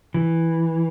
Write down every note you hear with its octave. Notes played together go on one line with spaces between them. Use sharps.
E3